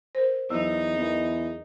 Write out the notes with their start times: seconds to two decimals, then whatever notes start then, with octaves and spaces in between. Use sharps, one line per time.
0.15 A#4 C5
0.50 E2 E3 F#3 D#4
0.97 E2 A#4 D#5